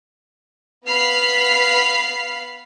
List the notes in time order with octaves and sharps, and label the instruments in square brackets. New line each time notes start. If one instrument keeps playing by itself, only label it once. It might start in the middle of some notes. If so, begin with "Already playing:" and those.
[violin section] B3 F5 B5 F6 C7